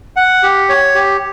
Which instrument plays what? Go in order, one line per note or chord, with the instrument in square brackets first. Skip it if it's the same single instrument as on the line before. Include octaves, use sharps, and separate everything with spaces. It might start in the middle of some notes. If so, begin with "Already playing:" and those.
[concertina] F#5
G4
C#5
G4